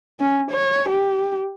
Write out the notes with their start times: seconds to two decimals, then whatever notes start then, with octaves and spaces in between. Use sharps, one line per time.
0.20 C#4
0.51 C#5
0.89 G4